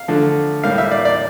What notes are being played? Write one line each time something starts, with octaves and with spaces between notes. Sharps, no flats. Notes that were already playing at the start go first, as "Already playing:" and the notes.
Already playing: F5
D3 F3 A3
A2 G3 A#3 F5
E5
D5
D5